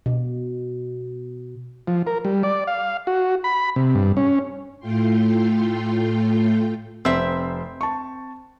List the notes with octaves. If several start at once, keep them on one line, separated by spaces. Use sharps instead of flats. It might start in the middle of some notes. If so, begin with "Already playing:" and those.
B2
F3
A#4
G3
D5
F5
F#4
B5
C3
G2
C#4
A2 A3 F4 G5 C6
F1 C4 C5 E5 E6
A5 C#6